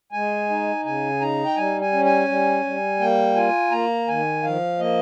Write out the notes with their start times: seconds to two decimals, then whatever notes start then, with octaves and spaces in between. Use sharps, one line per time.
0.12 G#3 G#5
0.49 D#4
0.84 C#3 G#5
1.21 D#4 A#5
1.45 G5
1.56 G3 G#5
1.81 G#5
1.92 C#4
2.05 G#5
2.28 G3
2.64 G3
2.99 A#3 G5
3.36 F4 G#5
3.71 A#3 A#5
4.08 D#3 G#5
4.43 F3 F5
4.79 A#3 D#5